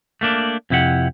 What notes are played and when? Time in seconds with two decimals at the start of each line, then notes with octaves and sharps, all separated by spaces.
0.21 A3 A#3 D4
0.70 F2 C3 E4 G4 F#5